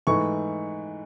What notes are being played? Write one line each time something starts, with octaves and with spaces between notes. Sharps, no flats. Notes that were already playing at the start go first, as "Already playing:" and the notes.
G#2 E3 A3 C#6